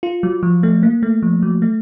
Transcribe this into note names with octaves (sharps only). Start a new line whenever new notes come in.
F4
F#3
F3
A3
A#3
A3
F3
F#3
A3